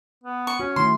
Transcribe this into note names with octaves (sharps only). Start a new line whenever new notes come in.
B3
C#6
C#4 F#4
D#3 A3 E4 C6